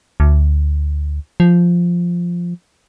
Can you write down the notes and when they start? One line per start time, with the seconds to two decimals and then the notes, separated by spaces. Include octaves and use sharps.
0.20 D2
1.40 F3